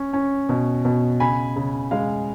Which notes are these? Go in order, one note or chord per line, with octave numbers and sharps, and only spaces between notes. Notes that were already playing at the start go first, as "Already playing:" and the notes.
Already playing: C#4
C#4
B2
B2
C#3 G#5 B5
C#3
G#3 F5